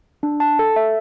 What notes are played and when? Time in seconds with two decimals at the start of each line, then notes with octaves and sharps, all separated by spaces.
0.23 D4
0.40 A5
0.59 A4
0.76 E5